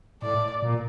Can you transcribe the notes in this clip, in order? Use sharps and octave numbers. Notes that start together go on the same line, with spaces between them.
A2 D5
A#2